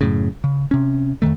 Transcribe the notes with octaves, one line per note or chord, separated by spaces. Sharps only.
F#2 A2 C#3
C#3
C3 C#4
F2 G#2 D#3 A3